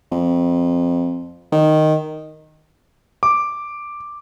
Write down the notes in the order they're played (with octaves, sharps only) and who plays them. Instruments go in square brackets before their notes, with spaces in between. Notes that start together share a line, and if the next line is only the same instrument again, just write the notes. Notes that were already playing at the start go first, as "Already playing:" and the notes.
[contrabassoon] F2
D#3
[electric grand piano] D6